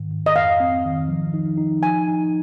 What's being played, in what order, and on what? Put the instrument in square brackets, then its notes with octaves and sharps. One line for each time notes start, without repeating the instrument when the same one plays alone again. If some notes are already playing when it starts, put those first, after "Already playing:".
Already playing: [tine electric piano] G#2 D#3
G#2
[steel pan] D#5
[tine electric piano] F2 [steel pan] F5
[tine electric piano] C4
D#3
F3
D#4
D#4
[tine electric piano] F3 [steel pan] G#5
[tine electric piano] D#4